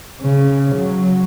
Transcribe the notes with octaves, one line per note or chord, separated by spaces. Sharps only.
C#3
F#3